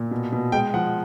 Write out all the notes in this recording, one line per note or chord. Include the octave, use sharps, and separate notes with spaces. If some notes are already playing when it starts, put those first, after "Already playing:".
Already playing: A#2
B2
B2
G#3 G5
F3 F#5